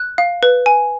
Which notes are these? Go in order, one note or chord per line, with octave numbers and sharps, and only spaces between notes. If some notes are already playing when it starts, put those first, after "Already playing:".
Already playing: F#6
F5
B4
G#5